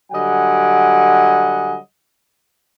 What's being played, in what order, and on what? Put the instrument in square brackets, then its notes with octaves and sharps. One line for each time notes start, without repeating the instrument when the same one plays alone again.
[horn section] D3 F#3 G3 D#5 F#5 G#5